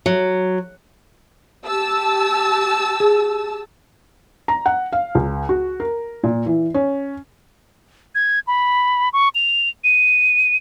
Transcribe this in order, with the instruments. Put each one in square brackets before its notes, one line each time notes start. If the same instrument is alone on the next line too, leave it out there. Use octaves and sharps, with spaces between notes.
[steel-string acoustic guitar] F#3
[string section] G4 A5 E6
[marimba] G#4
[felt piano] A#5
F#5
F5
C#2
F#4
A#4
A#2
E3
C#4
[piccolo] G#6
B5
C#6
F7
D#7